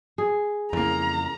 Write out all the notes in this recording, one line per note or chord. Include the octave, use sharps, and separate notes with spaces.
G#4
F2 C#3 E3 A#3 A#5